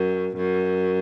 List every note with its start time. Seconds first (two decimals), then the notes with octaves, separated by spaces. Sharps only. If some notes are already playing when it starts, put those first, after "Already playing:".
Already playing: F#2
0.37 F#2